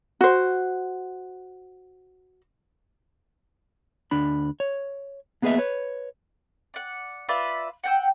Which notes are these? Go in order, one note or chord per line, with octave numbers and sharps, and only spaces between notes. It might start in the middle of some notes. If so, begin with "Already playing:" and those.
F#4 C5
D2 D4 B5
C#5
A#3 B3 G#4 B4 D#5 E5
B4 C#5
D5 F#5
F4 B4 D5 E5
F#5 G5 E6